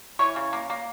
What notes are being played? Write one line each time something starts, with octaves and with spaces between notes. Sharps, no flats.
E3 C#5
C#3
A#3
A#3